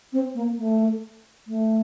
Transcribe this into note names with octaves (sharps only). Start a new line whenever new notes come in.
C4
A#3
A3
A3